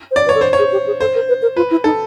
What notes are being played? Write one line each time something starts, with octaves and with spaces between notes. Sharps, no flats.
C5
C#5 D5
B4
C#5
A4
C5
C#5
G#4
G4
G#4
A4 C5
A#4
B4
A#4
F4 B4
E4
D#4 A4